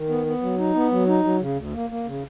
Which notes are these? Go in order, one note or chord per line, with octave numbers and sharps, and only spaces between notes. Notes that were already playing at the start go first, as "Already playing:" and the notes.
Already playing: D#3
B3
B3
F#3
D#4
B3
F#3
D#4
F#3
C#3
D2
A#3
A#3
C#3